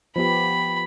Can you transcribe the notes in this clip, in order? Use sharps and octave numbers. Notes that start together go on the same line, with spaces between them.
F3 B3 G4 B5